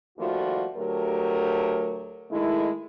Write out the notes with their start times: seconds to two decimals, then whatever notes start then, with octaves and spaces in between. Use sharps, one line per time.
0.18 D#2 F3 G3 A3 F4 F#4
0.77 D2 F#3 A3 G4 A#4
2.31 D#3 G#3 A3 E4